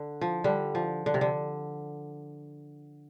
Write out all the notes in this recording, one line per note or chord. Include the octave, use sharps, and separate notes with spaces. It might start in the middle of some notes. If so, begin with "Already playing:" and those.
Already playing: D3
F3
D3 G3
F3
D3
C3
D3